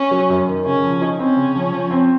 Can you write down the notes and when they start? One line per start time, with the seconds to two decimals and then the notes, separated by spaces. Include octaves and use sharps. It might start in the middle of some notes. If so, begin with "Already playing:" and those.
Already playing: C#4
0.11 F#3
0.30 F#2
0.48 D#3
0.66 C#3 C#4
0.83 F3
1.01 D#4
1.19 C4 C#4
1.37 C#3
1.56 F3
1.73 F3
1.91 C4